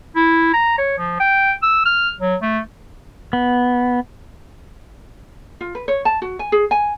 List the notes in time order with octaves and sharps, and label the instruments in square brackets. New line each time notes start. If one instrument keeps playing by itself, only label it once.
[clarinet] E4
A#5
C#5
F3
G5
E6
F6
F#3
A3
[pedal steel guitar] B3
[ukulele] F4
B4
C#5
A5
F#4
G#5
G#4
G#5